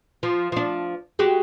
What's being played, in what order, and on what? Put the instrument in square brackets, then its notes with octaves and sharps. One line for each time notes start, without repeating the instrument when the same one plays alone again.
[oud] F3
F3 D4
G#3 F#4 G4